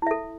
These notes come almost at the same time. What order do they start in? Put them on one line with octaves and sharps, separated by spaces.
E4 E5 A4